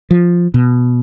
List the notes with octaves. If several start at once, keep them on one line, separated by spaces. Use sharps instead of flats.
F3
B2